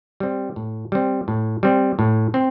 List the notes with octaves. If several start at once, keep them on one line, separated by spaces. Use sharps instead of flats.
G3 C4
A2
G3 C4
A2
G3 C4
A2
C4